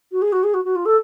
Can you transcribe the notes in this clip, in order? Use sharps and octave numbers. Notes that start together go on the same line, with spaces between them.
F#4
G#4
F#4
G#4
F#4
F#4
F4
A4